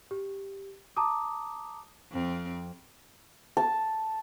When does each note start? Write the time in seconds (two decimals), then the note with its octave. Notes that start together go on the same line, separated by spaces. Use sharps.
0.11 G4
0.96 A5 A#5 D6 D#6
2.12 F2 C4
3.57 A5